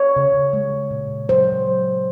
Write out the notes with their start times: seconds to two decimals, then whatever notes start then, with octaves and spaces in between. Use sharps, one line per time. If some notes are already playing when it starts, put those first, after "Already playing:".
Already playing: C#5
0.16 C#3
0.53 G#3
0.91 A#2
1.28 F#3 C5
1.66 F#3